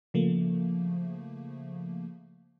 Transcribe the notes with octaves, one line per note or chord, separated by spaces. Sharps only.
C#3 F3 A3 A#3